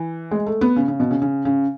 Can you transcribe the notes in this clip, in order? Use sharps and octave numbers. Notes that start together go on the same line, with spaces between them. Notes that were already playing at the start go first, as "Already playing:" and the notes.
Already playing: E3
G#3
A3
B3
C#3
C#3
B2
C#3
C#3
C#3